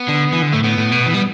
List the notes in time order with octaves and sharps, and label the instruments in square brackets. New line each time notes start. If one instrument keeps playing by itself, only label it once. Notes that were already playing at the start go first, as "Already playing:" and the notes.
Already playing: [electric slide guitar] B3
[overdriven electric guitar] D3
E3
D3
[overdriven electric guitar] A2 [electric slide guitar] A3
[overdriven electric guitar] A2 [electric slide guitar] B3
[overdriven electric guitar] A2
B2
E3
G3